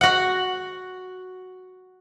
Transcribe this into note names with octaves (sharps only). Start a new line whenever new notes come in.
F#4 F#5